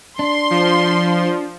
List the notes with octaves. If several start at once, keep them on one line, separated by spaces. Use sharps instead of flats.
D4 C6
F3